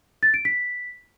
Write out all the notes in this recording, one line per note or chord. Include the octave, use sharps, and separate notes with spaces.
A6
D7
B6